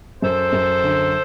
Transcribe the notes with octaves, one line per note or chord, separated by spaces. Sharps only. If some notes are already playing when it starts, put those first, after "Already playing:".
F#2 A4 C5
F#2
D3